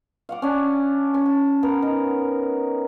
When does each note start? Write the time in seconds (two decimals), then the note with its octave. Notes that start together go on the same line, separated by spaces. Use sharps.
0.29 F5 F#5 D6
0.42 C#4 D4 G#5
1.14 C#4
1.26 A5
1.63 B3 A#4 F#5
1.82 D#4